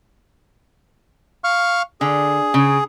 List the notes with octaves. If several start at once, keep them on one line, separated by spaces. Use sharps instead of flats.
F5 C#6 F6
D3 G#4
C#3